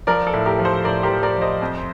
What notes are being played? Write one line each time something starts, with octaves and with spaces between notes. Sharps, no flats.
F3 A#4 D5
A4
A2
G4 A#4
F3
A4 C5
A2 A#4 D5
G4 A#4
F3
A#4 D5
F3
C5 D#5
F2